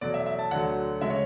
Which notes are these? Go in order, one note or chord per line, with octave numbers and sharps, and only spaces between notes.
E2 B2 F#3 A3 D5
E5
E5
A5
D2 D3 F#3 A3 F#5
C#3 G#3 E5
C#5